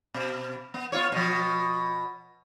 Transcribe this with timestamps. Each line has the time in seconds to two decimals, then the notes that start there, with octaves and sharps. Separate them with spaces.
0.14 B2
0.74 B3
0.92 B3 F4 C#5
1.12 B2 F3